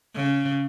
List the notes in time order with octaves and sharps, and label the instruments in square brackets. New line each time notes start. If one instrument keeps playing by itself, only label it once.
[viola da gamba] C#3